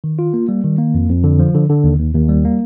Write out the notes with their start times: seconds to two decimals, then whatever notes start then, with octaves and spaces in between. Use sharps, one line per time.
0.04 D#3
0.19 F4
0.34 A#3
0.49 G3
0.64 D#3
0.78 A#3
0.94 F2
1.09 F2
1.24 D3
1.39 F3
1.54 D3
1.69 D3
1.84 D#2
1.99 D#2
2.14 D#2
2.29 G3
2.45 A#3